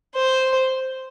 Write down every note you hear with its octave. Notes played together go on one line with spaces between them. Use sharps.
C5